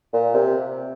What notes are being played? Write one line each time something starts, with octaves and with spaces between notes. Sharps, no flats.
A#2
C3